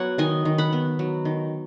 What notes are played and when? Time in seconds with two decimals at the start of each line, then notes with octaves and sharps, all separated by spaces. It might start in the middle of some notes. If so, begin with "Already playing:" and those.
Already playing: F#3 B3 C#5 F#5
0.18 D#3 D#5 G#5
0.45 D#3
0.58 F#5 B5
0.73 B3
0.99 F#3
1.25 D#3